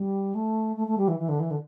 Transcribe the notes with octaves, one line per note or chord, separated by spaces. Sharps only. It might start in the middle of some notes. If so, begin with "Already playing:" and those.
Already playing: G3
A3
A3
A3
G3
E3
E3
D3
E3
D3